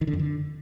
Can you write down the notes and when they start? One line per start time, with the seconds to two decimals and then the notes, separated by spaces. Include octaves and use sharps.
0.01 D#3
0.07 D3
0.13 F2
0.19 D3